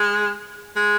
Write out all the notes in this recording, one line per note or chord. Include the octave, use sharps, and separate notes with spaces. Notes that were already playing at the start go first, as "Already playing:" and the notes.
Already playing: G#3
G#3